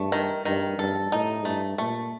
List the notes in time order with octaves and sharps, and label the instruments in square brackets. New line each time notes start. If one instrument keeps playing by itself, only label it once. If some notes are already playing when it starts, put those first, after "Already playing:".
Already playing: [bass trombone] G2 [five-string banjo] A3
[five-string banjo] D#3
[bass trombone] G2 [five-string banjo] D#3
[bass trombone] G2 [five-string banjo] A4
[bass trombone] A2 [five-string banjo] D#4
[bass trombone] G2 [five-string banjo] A3
[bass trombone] A#2 [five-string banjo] A3